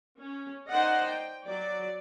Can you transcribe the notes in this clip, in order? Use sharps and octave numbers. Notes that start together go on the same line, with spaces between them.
C#4
D#4 C5 D5 D#5 F#5
G5
F#3 D5